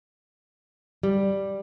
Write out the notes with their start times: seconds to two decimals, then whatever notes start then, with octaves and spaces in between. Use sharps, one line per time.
1.03 G3